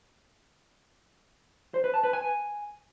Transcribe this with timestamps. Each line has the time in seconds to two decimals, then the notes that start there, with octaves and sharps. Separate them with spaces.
1.74 C5
1.84 B4
1.94 A5
2.04 B4
2.13 G#5